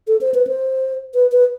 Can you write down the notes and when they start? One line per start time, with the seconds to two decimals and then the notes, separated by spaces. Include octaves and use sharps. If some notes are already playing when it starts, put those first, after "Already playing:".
0.08 A4
0.21 C5
0.34 B4
0.47 C5
1.15 B4
1.32 B4